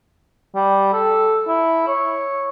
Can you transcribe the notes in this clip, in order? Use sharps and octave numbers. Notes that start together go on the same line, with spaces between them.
G3
A4
E4
C#5